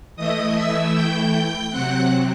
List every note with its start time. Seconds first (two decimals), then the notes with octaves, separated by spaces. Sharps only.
0.16 E3 A3 E4 D#5 D#6
0.55 E5 E6
0.93 G5 G6
1.71 C3 F#3 C4 F#5 F#6